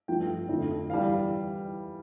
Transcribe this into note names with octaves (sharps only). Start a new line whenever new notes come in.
G2 F3 A3 G5
F2 D3 F3 A3
E3 G3 F5